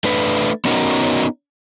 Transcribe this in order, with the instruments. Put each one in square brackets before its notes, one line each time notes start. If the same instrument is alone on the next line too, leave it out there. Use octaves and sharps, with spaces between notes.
[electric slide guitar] A3 D4 B4
B3 C#4 D#4 F#4 A#4